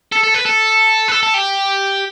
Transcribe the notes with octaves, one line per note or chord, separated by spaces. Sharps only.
A4
A4
B4
A4
B4
A4
A4
G4